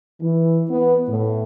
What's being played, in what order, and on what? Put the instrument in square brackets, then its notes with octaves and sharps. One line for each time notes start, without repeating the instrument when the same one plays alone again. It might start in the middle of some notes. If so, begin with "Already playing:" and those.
[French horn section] E3
B3
A2